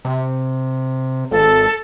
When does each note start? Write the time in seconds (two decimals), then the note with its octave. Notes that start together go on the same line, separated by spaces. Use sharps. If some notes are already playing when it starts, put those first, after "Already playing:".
0.05 C3
1.31 G#1 A4